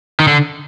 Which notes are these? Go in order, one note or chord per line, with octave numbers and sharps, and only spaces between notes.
D#3
D3